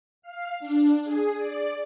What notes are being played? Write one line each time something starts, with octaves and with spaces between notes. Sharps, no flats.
F5
D4
G#4
D5